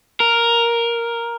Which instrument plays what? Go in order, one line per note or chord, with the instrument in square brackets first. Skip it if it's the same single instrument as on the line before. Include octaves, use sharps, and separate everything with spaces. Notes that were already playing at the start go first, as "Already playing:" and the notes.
[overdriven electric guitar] A#4